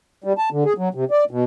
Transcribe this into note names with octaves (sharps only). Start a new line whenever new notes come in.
G3
A5
D3
G#4
F#3
C3
D5
B2